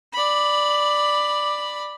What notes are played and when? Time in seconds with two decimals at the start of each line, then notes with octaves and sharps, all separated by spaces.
0.13 D5 B5